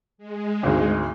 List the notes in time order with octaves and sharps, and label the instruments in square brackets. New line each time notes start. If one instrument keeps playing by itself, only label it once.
[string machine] G#3
[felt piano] G#1 D2